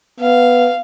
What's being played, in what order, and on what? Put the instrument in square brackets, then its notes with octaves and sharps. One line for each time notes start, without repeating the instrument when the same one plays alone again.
[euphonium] B3 [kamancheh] F5